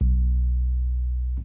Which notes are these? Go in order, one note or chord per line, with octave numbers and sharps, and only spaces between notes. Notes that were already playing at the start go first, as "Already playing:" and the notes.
B1